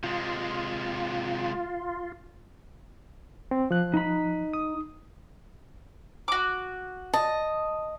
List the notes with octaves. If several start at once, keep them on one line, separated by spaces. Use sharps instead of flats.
C3 G#3 F4
C4
F3 F#6
D#4 B5
D#6
F#4 D6
D#5 A5